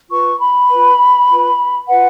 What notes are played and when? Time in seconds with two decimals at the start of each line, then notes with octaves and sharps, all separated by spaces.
0.11 F4 B4 C#6
0.41 B5
0.70 F4 B4
1.29 F4 B4
1.89 F4 B4 F#5